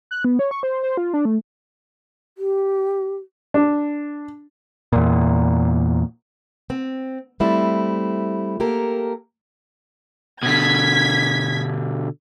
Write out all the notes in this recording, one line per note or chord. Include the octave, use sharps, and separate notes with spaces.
F#6
B3
C#5
C#6
C5
C5
F4
D4
A3
G4
D4
E2 A#2
C4
G3 A3 C4 E4
A#3 G4 A4 A#4
B2 D3 G#6 B6